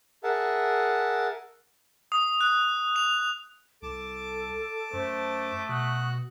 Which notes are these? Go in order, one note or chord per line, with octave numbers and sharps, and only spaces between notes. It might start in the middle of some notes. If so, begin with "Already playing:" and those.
G#4 A#4 E5 F#5 A5
D#6
F#6
F7
C2 A4 A5 D6
F#2 A3 C5
B2 F#4 D#6 F#6